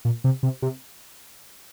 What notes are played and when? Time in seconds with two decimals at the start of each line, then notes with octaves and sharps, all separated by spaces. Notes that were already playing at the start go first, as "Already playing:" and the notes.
0.05 A#2
0.24 C3
0.43 C3
0.62 C3